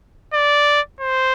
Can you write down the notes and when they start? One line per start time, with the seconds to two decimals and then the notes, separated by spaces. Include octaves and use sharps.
0.34 D5
1.01 C5